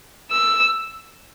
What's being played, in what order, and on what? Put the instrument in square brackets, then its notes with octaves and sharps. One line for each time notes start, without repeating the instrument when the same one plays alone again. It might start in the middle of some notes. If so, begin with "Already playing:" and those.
[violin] E6